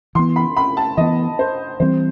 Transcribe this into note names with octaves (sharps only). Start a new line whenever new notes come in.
E3 B3 C6
B5
B5
A5
E3 B3 D#5
C5
E3 G3 C4 C5